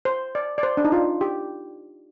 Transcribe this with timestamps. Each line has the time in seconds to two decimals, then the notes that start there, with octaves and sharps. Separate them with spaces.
0.05 C5
0.35 D5
0.58 D5
0.63 C5
0.77 D4
0.85 D#4
0.92 F4
1.21 G4